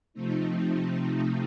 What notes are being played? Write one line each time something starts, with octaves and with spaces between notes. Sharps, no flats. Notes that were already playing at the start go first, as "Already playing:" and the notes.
C3 F3 A3 C4 D#4